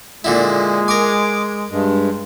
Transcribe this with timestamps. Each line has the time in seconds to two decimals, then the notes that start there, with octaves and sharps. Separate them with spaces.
0.24 A#2 D3 G#3 E4
0.88 A#4 G#5 D6
1.71 G2 G#3